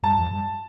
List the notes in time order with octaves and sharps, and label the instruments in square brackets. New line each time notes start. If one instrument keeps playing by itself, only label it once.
[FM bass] G2 [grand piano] A5
[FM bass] F2
G2